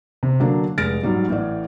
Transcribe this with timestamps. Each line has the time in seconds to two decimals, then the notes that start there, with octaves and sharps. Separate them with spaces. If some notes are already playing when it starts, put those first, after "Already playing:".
0.23 C3
0.40 D3 F#3 A#3 D4
0.78 F1 G#3 F6 A6 A#6 D7
1.03 G#2 F#3 G3
1.28 A1 A2 D5